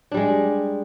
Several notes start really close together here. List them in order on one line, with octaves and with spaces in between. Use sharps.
D4 G3 G#3